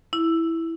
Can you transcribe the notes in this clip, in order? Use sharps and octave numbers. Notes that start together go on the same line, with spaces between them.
E4